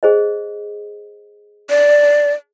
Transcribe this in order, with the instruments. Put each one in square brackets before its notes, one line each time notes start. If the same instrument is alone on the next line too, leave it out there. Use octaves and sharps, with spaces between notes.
[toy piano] G#4 C5 D#5
[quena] D5